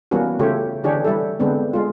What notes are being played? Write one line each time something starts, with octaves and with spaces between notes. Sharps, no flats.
E3 G3 A#3 B3 C#4 F#4
C#3 A3 F4 G4 C#5
D3 E3 D4 G4 G#4 C#5
G3 E4 A4
D3 G#3 B3 C4 D4
G#3 F4